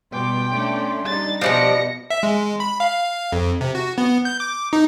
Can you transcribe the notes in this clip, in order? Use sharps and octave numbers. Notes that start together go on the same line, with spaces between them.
B2 G3 G5 C6 D6
A3 C#4 D4
G3 D4 D#4 A6
B2 F3 G3 B3 D4 D#5 A#6 C#7
E5
G#3
B5
F5
F2
C3
F#4
B3
G6
D6
D#4